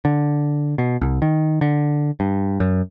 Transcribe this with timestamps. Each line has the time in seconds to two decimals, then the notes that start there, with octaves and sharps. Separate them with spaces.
0.05 D3
0.78 B2
1.01 C2
1.22 D#3
1.61 D3
2.20 G2
2.60 F#2